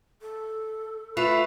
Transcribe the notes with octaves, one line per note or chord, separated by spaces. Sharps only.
A4
A3 F4 B4